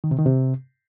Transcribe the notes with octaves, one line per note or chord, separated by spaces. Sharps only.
D#3
C3
D#3
C3